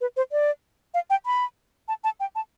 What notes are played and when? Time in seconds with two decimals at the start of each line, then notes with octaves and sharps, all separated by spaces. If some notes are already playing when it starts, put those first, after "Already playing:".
0.01 B4
0.17 C5
0.32 D5
0.94 F5
1.10 G5
1.26 B5
1.88 A5
2.04 A5
2.20 G5
2.35 A5